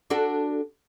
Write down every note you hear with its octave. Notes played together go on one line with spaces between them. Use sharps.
D4 F#4 A4